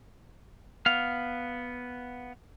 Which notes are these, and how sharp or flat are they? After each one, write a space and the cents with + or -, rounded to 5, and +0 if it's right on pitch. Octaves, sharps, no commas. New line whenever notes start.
B3 +0 F5 +0